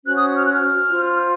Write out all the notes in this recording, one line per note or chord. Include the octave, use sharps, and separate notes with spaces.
C#4 F#4 C5 F#6
D#6
F6
F#6
F6
F4 C5